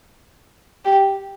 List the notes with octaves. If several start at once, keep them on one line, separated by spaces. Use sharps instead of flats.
G4